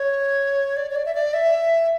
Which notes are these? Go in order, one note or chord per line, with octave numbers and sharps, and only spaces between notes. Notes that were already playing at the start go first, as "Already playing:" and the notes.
Already playing: C#5
D5
C#5
D5
E5
D5
E5